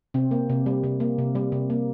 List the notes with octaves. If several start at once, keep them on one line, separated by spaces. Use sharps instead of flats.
C3 C4
A#3
C3
G3
C3
A#3
C3
G3
C3
A#3